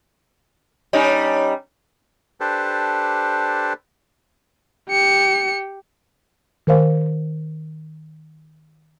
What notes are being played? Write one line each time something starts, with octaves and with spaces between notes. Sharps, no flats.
G3 C#4 D#4
D4 G4 A4 B4 C5
G4 C#7
D#3 A#4 C5 F5